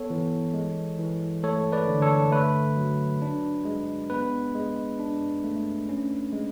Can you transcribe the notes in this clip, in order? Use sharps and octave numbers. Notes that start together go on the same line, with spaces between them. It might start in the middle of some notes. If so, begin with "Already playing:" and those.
Already playing: B3 A4 C#5
E3
G#3
E3
A3 A4 C#5
B4 D5
D3
A4 C#5
A3 B4
F#3
D4
G#3
B3 B4
G#3
D4
A3
C#4
G#3